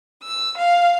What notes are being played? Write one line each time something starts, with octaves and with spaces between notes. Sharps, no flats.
E6
F5